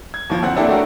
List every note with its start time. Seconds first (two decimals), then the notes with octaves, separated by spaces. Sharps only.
0.14 G#6
0.30 D#2 F3
0.42 D2 C4 F#5
0.56 A#3 C4 D4 E4 G4 A4
0.69 A3 D4 F#4 G4 A#4